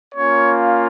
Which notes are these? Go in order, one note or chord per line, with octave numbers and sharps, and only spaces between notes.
A#3 C#4 F4 C#5